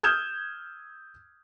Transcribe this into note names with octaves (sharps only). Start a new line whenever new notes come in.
D#6 F6 G6 G#6 E7